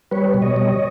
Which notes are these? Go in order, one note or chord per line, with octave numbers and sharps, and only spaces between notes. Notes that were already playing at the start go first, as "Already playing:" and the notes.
G3 B4 C#5
B2
C#5 D#5
G3